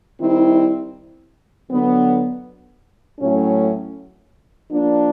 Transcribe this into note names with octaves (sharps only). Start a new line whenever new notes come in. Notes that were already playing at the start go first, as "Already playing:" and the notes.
D#3 G3 C4 E4
D3 F#3 B3
A2 F#3 A3 C#4
F3 A#3 D4